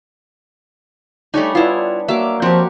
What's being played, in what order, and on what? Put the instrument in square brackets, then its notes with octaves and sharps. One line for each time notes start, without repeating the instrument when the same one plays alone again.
[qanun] G3 C#5 G#5 [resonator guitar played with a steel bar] A3 D#4 [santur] D4
[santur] B3 D4 [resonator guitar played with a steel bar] E4 F4
[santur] F#3 [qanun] A#3 D6 [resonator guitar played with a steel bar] E5
[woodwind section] F3 [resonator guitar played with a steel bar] C4 [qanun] F#4 G4